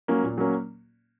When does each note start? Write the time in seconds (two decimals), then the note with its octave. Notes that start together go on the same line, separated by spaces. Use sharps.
0.08 F#3 A#3 C#4
0.24 A#2
0.38 F#3 A#3 C#4